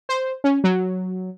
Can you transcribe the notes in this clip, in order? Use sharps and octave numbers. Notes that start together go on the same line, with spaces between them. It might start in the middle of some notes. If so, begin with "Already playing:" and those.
C5
C#4
F#3